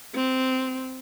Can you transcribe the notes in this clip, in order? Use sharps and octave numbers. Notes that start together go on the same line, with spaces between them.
C4